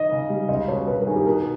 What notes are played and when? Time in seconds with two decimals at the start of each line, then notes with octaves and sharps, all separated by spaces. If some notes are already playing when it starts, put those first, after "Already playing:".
Already playing: D#3 D#5
0.11 C#3
0.30 G3
0.48 C#2 D#5
0.68 B2 C#5
0.87 G2 B4
0.98 A#4
1.07 D#3 G#4
1.16 G4
1.26 B2 A#4